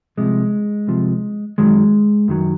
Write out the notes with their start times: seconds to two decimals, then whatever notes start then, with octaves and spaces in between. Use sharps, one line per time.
0.17 C2 C3 F3 G#3
0.87 C2 C3 F3
1.58 F#2 D#3 F#3 G#3
2.28 F#2 D#3 F#3